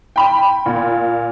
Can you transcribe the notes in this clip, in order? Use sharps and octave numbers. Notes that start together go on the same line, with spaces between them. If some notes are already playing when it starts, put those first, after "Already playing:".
G5 B5
A#2